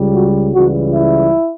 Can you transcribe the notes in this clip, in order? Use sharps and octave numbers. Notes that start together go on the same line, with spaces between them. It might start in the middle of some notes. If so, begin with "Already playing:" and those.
Already playing: C#2 C#3 G3
F#4
C#2 C#3 E3 G3 F#4
E4